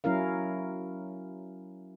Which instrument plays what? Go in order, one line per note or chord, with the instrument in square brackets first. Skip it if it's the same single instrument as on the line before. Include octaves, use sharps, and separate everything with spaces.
[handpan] F#3 C#4 E4 A#4 F5